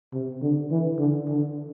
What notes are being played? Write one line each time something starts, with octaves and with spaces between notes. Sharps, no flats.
C3
D3
E3
D3
D3